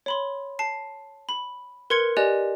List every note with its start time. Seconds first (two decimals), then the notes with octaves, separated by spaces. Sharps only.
0.06 C#5 B5 C6
0.59 A5 C7
1.29 B5
1.90 A#4 B4 C6 G#6 C#7 G7
2.17 G4 D5 D#5 G#5 F#6 F7